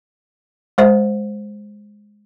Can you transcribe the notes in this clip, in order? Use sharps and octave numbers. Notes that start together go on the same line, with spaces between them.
G#3 C5 E5